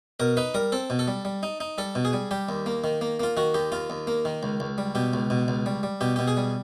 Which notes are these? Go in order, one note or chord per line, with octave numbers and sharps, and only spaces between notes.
B2 A#4
D#4 B4
G3 A#4
C4 A4
B2
A4
G3
G3
D#4
D#4
G3 A4
B2
G#4
G3
G3 G4
D#2
A#3
D#3
A#3
A#3 F4
D#3 F#4
D#2 G4
D#2 F4
D#2
A#3
D#3
C#2
C#2
G3
B2 G4
C#2
B2
C#2
G3
G3
B2 G4
B2 G4
G#4
G3